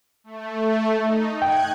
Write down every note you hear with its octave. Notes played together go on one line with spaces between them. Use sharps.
A3
D#4
G5 F#6 G#6